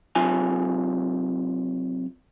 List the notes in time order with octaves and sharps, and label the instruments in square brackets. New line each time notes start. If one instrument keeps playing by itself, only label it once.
[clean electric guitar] C3 F#3 F4 G#5